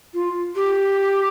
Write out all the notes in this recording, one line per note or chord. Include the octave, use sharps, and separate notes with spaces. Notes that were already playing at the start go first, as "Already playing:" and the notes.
F4
G4